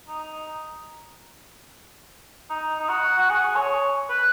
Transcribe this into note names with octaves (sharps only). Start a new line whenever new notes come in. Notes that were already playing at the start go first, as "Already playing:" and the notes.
D#4
D#4
D#4
F#4
F#4
G#4
C#5
B4